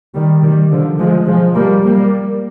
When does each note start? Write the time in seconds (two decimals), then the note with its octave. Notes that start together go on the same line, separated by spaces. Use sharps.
0.15 D#3 G3
0.42 D#3 G3
0.71 D3 F3
0.99 F3 G#3
1.27 F3 G#3
1.55 G3 A#3
1.83 G3 A#3